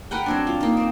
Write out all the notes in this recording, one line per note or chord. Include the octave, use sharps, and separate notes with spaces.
A#4 B4 F#5 G5
F#3 C4 D4
F4
A#3 D#4
C4